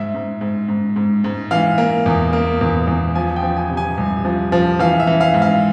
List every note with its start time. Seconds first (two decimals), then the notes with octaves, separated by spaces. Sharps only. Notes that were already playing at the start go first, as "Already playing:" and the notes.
Already playing: G#2 E5
0.15 G#2
0.41 G#2
0.68 G#2
0.96 G#2
1.24 G#2
1.51 E3 F5
1.78 A#3
2.06 E2
2.33 A#3
2.61 E2
2.87 E2
3.15 F3 G#5
3.36 G5
3.42 F3
3.57 G#5
3.70 C3
3.77 G#5
3.98 C2
4.25 F3
4.52 F3
4.79 E3 F5
5.00 E5
5.07 E3
5.21 F5
5.34 G#2
5.42 F5